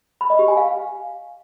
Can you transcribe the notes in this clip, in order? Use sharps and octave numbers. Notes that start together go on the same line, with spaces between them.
B5
D#5
G4
G#5
F5